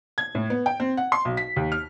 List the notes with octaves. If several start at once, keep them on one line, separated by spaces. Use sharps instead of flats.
G#6
A2
B3
G5
C4
F#5
C6
B1
B6
D#2
F6